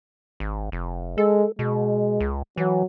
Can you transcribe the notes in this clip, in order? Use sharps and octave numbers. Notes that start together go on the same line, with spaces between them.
G#1
F1
G#3 A4
B2 G#3
C#2
E3 F#3